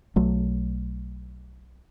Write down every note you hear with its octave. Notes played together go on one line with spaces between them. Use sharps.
B1 F#3 A3